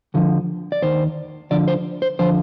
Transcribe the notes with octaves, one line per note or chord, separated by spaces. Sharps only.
D2 D3 F3
D5
D#2 D#3 C5
D2 D3 F3 D5
C5
C5
D3 F3 C5